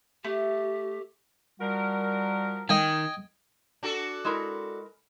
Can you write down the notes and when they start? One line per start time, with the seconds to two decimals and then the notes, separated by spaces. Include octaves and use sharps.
0.24 A3 G4
1.60 F3 G3 F#4 A#4
2.69 D#3 D#5 G5 G#5
3.83 D4 F#4 A4
4.25 G#3 E4 A#4